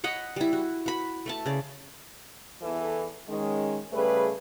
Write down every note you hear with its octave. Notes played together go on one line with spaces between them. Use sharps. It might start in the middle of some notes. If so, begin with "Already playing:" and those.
C#5 D#5 F#5 B5
G3 E4
F#4
F#4 B5
A3 E5 A5
C#3 D5
E2 E3 A4
D#3 G#3 C#4
C#3 G3 A3 G#4 B4